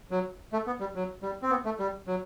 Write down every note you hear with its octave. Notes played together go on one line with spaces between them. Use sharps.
F#3
A3
B3
G3
F#3
G3
C4
B3
A3
G3
F#3